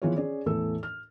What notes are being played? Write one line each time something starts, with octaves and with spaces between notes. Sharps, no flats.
E3 F3 B3 F4 G#4 C#5
C#4 G#4 D5
E2 A2 E3 A4 E6
F6